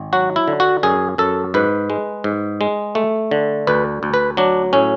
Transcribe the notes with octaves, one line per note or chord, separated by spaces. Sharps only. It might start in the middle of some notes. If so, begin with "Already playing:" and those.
Already playing: G#1
F#3 F#4
E4
D3
F#4
F#2 G#4
F#2 A4
G#2 B4
G#3
G#2
G#3
A3
D3
D2 B4
D2
B4
F#3 D4
A2 C#4